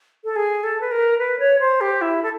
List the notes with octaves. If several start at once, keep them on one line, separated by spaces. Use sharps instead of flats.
A4
G#4
A4
B4
A#4
B4
C#5
C5
G4
E4
A4